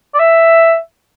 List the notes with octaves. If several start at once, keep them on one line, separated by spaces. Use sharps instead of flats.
D5
E5